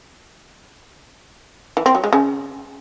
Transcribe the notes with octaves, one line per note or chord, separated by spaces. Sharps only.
E3
C4
F#3
G#3
C#3